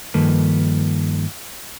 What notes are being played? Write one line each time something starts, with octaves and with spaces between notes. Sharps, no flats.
G2 D#3 F3 A#3 A4 B4